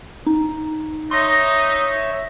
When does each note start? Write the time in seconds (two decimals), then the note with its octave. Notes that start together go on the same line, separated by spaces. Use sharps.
0.27 D#4
1.11 D#4 C#5 E5 C6 A#6